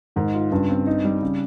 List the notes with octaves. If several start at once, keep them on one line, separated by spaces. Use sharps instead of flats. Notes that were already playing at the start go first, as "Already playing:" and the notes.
G#2 D#3
F4
G2 C#3
C4
D#4
G3
C#3